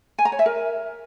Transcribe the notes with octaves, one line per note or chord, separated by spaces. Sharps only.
G#5
A#5
C#5
E5
A#4